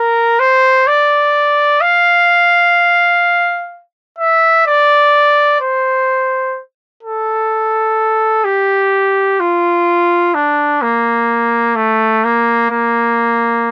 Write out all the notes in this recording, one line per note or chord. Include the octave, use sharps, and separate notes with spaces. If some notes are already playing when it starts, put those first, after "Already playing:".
Already playing: A#4
C5
D5
F5
E5
D5
C5
A4
G4
F4
D4
A#3
A3
A#3
A#3